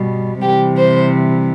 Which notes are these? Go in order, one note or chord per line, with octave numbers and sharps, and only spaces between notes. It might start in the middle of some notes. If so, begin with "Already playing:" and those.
Already playing: B2 G3
C3 E3 G3 G4
C5